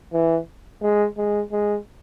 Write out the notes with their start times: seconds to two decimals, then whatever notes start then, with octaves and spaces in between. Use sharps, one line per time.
0.13 E3
0.82 G#3
1.17 G#3
1.52 G#3